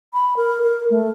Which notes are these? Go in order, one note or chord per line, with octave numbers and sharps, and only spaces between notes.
B5
A#4
A#4
A3